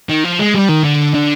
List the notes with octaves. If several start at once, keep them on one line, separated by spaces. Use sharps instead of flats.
D#3
F3
G#3
G3
D#3
D3
D3